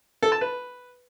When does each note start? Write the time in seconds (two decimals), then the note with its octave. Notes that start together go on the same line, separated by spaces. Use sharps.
0.22 A4
0.32 A5
0.41 B4